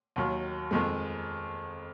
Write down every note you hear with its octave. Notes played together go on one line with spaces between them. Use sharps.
D#2 D#3 F#3
F2 D#3 G#3